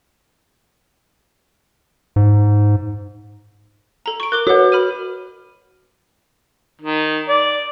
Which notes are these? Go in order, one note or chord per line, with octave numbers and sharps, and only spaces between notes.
G#2
A4 A#5
C#6 D7
A#4 D6 F#6 G7
F#4 B4 C#5 F#5
B5 F6 D#7
D#3
D5